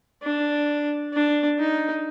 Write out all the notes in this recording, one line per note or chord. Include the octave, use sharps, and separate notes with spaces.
D4
D4
D#4